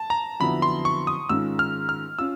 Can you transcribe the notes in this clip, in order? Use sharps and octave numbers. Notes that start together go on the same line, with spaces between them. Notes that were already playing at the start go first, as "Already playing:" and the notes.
Already playing: A5
A#5
F2 D3 F#3 B3 E4 B5
C6
C#6
D#6
G#2 D#3 G#3 C#4 F4 E6
F6
F6
C#4 F4 E6